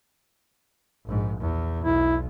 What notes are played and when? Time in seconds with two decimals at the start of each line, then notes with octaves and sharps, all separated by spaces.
1.05 A#1 G#2
1.40 E2
1.84 B1 E4